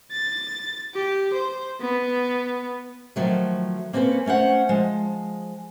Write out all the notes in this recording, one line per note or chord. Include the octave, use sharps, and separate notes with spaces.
A6
G4
C5
B3
D#3 F3 F#3 A3
A#3 C4 C#4 A4 B4
A3 C#4 C5 F#5
F3 G#3